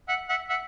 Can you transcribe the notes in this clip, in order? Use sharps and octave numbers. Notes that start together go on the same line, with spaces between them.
E5 F#5
E5 F#5
E5 F#5